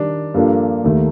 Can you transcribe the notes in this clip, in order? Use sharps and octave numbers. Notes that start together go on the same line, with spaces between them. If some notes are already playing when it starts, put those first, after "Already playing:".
Already playing: D#3 G3 D4
G2 F3 A#3 D4 A4
D#2 D#3 A3